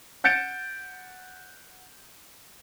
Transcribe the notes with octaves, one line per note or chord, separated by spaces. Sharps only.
F#5 G6 A6 C#7 D7 E7